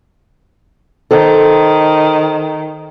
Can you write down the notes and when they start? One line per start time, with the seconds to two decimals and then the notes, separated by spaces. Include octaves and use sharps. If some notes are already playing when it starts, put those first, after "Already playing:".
1.11 D#3 A4 C5